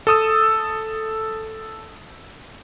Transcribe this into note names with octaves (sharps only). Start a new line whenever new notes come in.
A4 D#6 E6